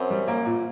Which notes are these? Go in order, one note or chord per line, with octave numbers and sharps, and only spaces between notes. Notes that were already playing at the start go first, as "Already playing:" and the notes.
Already playing: F#2 C4
G3
A#3
A#2